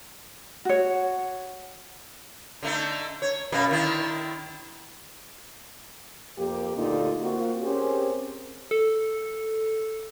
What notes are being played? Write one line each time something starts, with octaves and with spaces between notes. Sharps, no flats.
F#4 C#5
D3 A3 D#4
C#5
F#2 B2 A#3
D3 D#3 E4
F2 A#3 G4
D2 A#2 D3 D#4 F4 G4
A#3 C4 F4 F#4
C4 C#4 G4 G#4 A#4 C5
A4